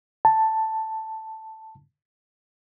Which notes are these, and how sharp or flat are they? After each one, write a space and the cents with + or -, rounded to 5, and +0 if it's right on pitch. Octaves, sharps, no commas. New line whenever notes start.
A5 +5